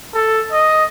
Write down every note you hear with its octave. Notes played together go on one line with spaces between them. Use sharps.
A4
D#5